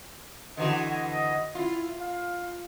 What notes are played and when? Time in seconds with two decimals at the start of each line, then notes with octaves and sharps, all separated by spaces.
0.57 D3 E3 F#4 D#5
1.55 E4 F4
2.00 F5